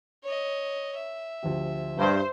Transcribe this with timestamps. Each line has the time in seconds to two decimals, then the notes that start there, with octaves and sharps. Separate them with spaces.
0.24 C#5 D#5
0.96 E5
1.43 D2 F3 G4
1.98 G2 C5